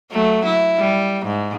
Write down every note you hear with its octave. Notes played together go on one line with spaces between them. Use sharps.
F#3 A3
E4
G3
G#2